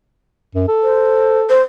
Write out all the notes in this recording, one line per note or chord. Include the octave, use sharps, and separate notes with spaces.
F#2
A4
C5
C5